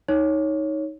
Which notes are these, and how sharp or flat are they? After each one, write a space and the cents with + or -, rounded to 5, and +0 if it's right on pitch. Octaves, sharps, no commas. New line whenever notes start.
D#4 +10 C#5 +0